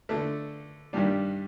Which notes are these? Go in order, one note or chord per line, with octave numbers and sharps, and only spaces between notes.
D3 A3 D4
G2 D#3 G3 D4